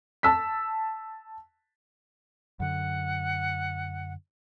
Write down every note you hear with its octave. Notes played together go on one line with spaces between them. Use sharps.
A5 E6 B6
F#2 D3 F#5